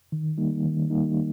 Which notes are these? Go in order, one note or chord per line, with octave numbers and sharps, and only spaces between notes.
D#3
G3 A#3 D#4
D#3
G3 A#3 D#4